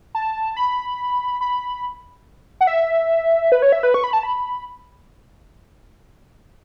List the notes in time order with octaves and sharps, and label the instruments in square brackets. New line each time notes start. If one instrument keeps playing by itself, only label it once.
[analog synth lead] A5
B5
B5
F#5
E5
B4
C#5
E5
B4
C#6
B5
A5
B5